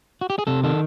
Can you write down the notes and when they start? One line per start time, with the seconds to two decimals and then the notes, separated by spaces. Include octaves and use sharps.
0.21 F#4
0.30 G4
0.39 G#4
0.47 C3 A4
0.64 D#3 A4